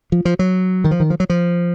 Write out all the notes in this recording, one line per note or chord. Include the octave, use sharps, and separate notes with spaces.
F3
F3
F#3
D#3
F3
D#3
F3
F#3
F3